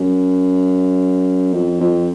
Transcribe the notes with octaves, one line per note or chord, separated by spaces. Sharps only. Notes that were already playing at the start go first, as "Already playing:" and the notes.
Already playing: F#2
F2
F2